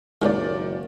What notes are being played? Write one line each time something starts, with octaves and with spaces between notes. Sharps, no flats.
F#1 A#2 D#3 F#3 G#3 D5